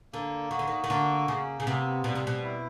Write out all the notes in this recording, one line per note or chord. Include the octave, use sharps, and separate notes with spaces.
D3 A#3
D#3 F#4
D3
D#3
D#3
D3 A#3
C#3 A#3
C#3
C3 B3
B2 G3
C3
B2
E4